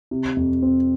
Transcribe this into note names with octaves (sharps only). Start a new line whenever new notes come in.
C3
F2
C4